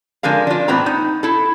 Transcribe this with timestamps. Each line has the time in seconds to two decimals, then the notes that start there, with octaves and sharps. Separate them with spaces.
0.23 D3 F3 G#3 A#4 F5
0.47 D4 F4
0.68 A2 E3 B3 C4 A#5
0.86 D#4
1.23 E4 A4